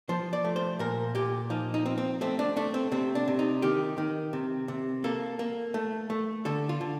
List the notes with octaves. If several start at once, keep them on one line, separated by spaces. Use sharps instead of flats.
F3 C5
D5
A3
C5
A#2 A#4
A#2 G4
F3 D#4
D#4
C4
C4
A3 C4
D4
A3 D4
C4
C3 C4
D4
C3
D#4
D#3 G4
D#3
C3
C3
A#3 A4
A#3
A3
A3
D3 A4
F4
D3